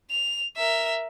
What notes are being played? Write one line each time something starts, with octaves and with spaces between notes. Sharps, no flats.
F7
A#4 E5